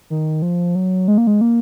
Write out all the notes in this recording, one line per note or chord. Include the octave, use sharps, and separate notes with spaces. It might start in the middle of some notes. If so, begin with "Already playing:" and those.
D#3
F3
F#3
G#3
A#3
G#3
A#3